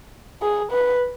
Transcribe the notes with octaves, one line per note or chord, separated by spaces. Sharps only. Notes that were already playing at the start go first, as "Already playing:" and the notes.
G#4
B4